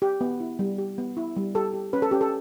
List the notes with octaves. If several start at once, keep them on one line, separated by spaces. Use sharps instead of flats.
G4
B3
E4
G3
G4
B3
E4
G3
G4 A4
G4
C#4 B4
A4
C#4 G4
A4